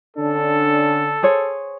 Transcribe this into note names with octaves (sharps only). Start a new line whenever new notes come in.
D3 C#4 D4 A4
G#4 C5 C#5